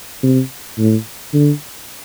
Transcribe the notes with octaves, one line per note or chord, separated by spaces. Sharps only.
C3
A2
D3